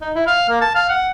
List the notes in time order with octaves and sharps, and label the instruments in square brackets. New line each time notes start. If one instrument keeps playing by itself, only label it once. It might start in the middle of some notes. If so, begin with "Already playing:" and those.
[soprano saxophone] D#4
E4
F5
A#3
A5
F5
F#5